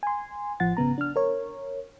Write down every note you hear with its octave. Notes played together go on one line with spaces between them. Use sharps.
G#5 C6
A1 F3 F#5 A6
G#1 C#3 B3 A#5
D4 F6
A#4 C#5